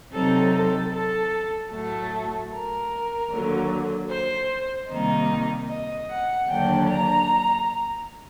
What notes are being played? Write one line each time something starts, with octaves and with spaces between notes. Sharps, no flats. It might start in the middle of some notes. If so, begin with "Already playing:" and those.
C3 F#3 C4 D#4 A4
A4
A4
A2 F#3 A3 A4
A#4
D#2 D3 F#3
C5
C3 D#3 G3 A#3 D#4 D#5
D#5
F#5
D#2 D3 F#3 A#3 D4 G5
A#5